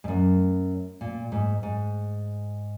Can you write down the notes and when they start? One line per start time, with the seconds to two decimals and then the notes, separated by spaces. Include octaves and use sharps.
0.04 G#2
0.08 F#2
1.01 A#2
1.32 G#2
1.63 G#2